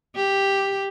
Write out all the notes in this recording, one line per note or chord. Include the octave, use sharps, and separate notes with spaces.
G4